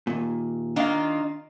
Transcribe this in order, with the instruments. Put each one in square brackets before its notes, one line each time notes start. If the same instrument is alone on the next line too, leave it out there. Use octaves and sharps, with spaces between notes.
[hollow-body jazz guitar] D#2 A#2
[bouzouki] D#3 A#3 F4 [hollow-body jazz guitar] D4 F5